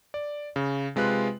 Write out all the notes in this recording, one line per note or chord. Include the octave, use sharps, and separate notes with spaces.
D5
C#3
C3 G#3 F4 B4 F#6